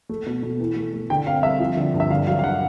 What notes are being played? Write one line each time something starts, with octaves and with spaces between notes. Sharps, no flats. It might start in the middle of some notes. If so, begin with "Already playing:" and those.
A3
B2
B2
E3
A3
A3
D3 G5
C4 F5
G3 E5
F3
D3
G2
E5
D3 F5
F#3 F5
F5
D3 F#5